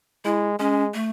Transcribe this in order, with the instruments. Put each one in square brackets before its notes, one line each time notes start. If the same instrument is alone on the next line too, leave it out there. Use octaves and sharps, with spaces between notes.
[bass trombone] G#3 [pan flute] E4
[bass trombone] G#3 [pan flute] C#4
[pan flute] A3